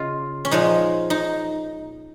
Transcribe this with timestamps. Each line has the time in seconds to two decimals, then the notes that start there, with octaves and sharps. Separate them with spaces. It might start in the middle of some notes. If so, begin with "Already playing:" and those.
Already playing: C#3 F4 D#5
0.45 C#4
0.51 A#2 F3 G#3 D#4
1.10 D#4